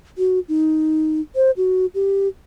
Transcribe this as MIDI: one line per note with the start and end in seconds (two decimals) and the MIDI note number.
0.18 0.40 66
0.49 1.21 63
1.36 1.51 72
1.57 1.86 66
1.95 2.28 67